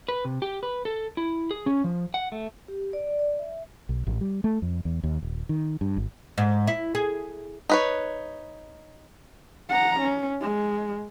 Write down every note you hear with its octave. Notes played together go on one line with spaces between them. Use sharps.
B4
C3
G4
B4
A4
E4
G#4
C#4
F3
F#5
A3
G4
D5
D5
E5
B1
A1
G3
A3
F2
E2
D#2
D#1
D#3
G2
G#1
G#2
E4
G#4
D#4 B4 C#5
F#5 A#5
C#4
G#3